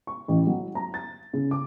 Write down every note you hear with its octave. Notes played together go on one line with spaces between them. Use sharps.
C#6
A1
F#3
A#5
A6
C#3
D6